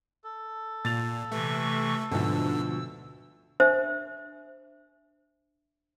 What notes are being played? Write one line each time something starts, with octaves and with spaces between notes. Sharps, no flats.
A4
A#2 A6 F7
C3 E3 A3 C#6
D2 G#2 B2 D3 F3 E6
D4 C5 E5